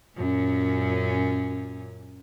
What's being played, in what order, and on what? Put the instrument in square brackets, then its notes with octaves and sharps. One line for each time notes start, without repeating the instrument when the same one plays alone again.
[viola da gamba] F#2 A#2 C#4